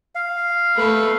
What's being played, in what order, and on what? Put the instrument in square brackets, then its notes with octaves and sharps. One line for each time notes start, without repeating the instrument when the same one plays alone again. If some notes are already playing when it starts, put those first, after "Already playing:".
[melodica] F5
[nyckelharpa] A3 B4